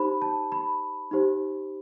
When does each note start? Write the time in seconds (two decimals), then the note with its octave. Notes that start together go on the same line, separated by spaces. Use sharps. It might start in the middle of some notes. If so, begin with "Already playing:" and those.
Already playing: D#4 G4 C5 B5
0.22 A5
0.52 B5
1.11 D#4 G4 C5